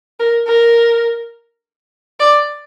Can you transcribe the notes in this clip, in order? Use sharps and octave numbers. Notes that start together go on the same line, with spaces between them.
A#4
A#4
D5